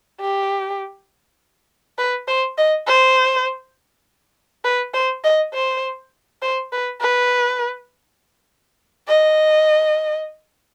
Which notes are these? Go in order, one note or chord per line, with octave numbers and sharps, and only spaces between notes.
G4
B4
C5
D#5
C5
B4
C5
D#5
C5
C5
B4
B4
D#5